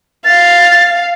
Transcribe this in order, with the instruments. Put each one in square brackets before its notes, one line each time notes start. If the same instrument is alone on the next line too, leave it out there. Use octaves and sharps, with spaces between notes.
[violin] F5 [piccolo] A6